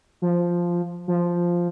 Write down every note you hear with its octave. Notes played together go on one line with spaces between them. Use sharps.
F3
F3